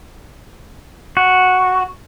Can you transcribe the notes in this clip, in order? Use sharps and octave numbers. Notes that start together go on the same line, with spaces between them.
F#4